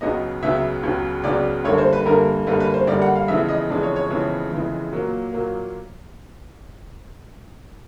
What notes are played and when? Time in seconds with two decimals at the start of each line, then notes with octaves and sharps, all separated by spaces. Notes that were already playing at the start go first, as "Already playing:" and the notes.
0.01 C#2 C#3 F#3 B3 D#5
0.43 C#2 C#3 F#3 B3 E5
0.83 C#2 C#3 F#3 B3
1.24 C#2 C#3 F#3 B3 D5
1.64 F#2 D3 G3 A#3 C#5
1.78 C5
1.93 B4
2.05 F#2 D3 G3 A#3 A#4
2.47 F#2 D3 G3 A#3 B4
2.60 B4
2.74 C5
2.87 F#2 D3 G3 A#3 D5
3.02 F#5
3.15 F5
3.28 F2 C#3 E3 G#3 B3 E5
3.48 D#5
3.70 F2 C#3 E3 G#3 B3 D5
3.83 C#5
3.96 C#5
4.10 F2 C#3 E3 G#3 B3
4.51 F2 C#3 E3 G#3 B3
4.92 A#2 F#3 A#3
5.33 A#2 F#3 A#3